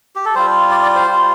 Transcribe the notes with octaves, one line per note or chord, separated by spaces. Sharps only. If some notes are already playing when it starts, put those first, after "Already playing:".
G4
A4
G3 F4 C5
D5
D5
C5
G3 F4